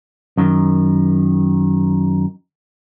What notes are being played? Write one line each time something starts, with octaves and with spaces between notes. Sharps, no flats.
F#2 D#3